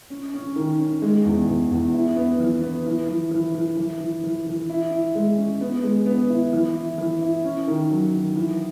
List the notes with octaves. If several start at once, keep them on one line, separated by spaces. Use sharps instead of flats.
C#4
C#4
D#3
C#4
G#3
E2
E2
E2
E4
B3
E3
B3
E3
E3
E3
E3
E3
E3
E3
E3
E4
E4
G#3
C#4
B3
G#3
B3
E4
E3
E4
E3
E4
C#4
D#3
F#3
D#3
E3